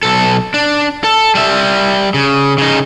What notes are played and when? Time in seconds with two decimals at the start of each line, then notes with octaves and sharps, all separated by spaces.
0.03 B1 A4
0.54 D4
1.04 A4
1.35 G3 E5
2.14 C#3
2.58 C#3 D#4